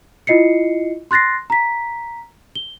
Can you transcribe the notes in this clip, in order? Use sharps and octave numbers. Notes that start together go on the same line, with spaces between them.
E4 F4 D#5 C7 C#7
C6 F#6 A6 A#6 C7
A#5 B6
G7